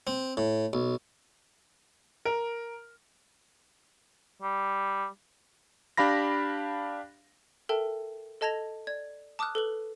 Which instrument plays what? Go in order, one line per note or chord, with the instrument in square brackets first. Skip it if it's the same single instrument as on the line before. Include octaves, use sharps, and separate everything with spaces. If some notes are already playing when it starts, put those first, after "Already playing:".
[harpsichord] C4
A2
B1
[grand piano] A#4
[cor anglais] G3
[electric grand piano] D4 G4 F5 B5 A#6
[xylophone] A4 A#4 E5 G5 A5
A4 D#5 A5 G#6 A#6 F7
D5 G#6
A5 D6 D#6 F6 F#6
A4 B4 F#7